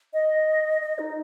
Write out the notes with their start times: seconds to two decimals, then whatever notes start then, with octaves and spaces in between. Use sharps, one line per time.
0.13 D#5
0.82 D#5
0.99 D#4